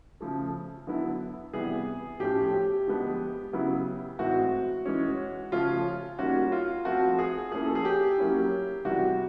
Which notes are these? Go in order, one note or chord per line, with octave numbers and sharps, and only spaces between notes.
C#3 F3 A3
D3 F#3 B3 E4
C3 E3 G3 B3 G#4
A2 F3 A3 C#4 F4 G4
G4
D3 F3 G#3 B3
C#3 F#3 B3 E4
A2 E3 G#3 C4 F#4
E3 G#3 C#4
C#3 F3 A3 C#4 F4
D#3 G3 A#3 C#4 F4 F#4
F4
F3 A3 C4 F4 F#4
G#4
F3 A#3 C#4 E4 G#4
A4
G#4
G4
F#3 A#3 C#4 E4
C3 E3 G3 F#4